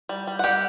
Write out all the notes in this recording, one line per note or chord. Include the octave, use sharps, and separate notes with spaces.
G3
G3
F#5
G3 G4 G5